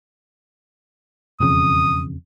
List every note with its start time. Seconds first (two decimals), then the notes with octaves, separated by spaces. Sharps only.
1.40 E1 F2 C#3 D#6